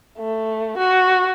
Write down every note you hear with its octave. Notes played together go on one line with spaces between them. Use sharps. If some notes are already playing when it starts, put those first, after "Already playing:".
A3
F#4